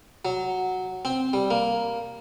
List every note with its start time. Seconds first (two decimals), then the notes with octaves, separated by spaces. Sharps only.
0.25 F#3
1.05 C4
1.33 G3
1.51 A#3